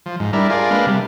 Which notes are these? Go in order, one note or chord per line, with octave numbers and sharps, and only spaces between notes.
F3
G#2
G3 D4 E4 A#4
F4 G#4 A#4 D5
G#3 A#3 D4 B4 F5
C3 G3